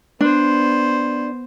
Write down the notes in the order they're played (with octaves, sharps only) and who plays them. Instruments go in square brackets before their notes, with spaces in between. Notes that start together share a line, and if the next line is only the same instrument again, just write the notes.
[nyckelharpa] B3 C5 [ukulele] D4